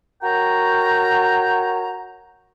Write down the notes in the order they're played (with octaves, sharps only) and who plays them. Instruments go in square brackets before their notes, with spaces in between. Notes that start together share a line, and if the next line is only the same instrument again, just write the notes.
[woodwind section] F#4 A#4 C#5 G5 A#5